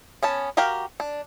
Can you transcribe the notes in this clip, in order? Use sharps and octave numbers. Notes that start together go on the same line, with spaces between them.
B3 C#4 A5
F#4 G4 A#4 F5 G5
D4